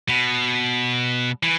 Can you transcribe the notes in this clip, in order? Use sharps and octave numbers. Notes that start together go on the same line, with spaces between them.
B2
E3